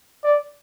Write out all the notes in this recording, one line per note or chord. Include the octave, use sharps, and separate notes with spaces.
D5